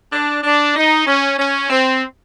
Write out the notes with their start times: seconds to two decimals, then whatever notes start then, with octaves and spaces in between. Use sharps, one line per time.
0.13 D4
0.44 D4
0.76 D#4
1.07 C#4
1.39 C#4
1.70 C4